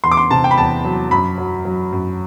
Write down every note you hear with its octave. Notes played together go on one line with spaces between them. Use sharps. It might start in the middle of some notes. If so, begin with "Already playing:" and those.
E2 C6
D6
C6
C3 A5
G5
B5
E2 A5
F#3
F#2 B5
F#3
F#3
F#2